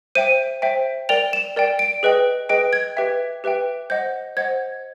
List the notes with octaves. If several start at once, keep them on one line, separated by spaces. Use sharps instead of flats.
C5 E5 G5 D#7
C5 E5 G5
A#4 D5 G5 F7
E7
A#4 D5 G5
D7
G#4 B4 D#5 G5
G#4 B4 D#5 G5 D7
G#6
G4 B4 E5 G5
G4 B4 E5 G5
C5 D#5 F#5 G6
C5 D#5 F#5 G#6